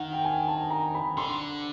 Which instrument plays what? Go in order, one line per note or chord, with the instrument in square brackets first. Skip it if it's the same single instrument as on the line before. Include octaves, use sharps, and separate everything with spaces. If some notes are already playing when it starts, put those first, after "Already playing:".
Already playing: [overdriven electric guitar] D#3 [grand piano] F#5
[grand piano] G5
G#5
A5
A#5
B5
[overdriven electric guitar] D3 [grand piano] C6